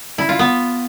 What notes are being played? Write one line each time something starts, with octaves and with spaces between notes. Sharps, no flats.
E4
F4
B3